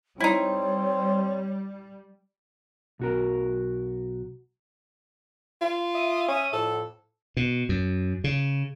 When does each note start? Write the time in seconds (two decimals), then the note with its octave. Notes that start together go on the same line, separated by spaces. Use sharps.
0.20 G3 C4 D#4 E4 C#5
2.99 B1 F#4 A#4
5.62 F4
5.95 E5 D#6
6.28 C#4 E5 D#6
6.53 F2 A2 A4
7.37 B2
7.69 F#2
8.24 C#3